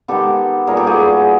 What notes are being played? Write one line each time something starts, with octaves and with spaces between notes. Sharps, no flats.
D#3 G#3 B3 G4 A4
A#2 G3 B3 G#4 A#4
G4 A4
F#4 G#4